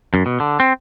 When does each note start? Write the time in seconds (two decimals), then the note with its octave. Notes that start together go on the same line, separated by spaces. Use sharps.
0.14 F#2
0.26 B2
0.40 D3
0.60 C4